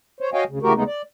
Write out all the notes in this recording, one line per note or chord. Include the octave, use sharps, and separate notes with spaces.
C5 C#5
F#4 C#5 D#5 F5 G5 G#5
D2 C#3
C#3 E3 A3 F#4 G4 A#4
D#2 C#3 G#3 A3 B3 D#4
D5